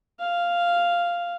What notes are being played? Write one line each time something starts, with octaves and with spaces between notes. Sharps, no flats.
F5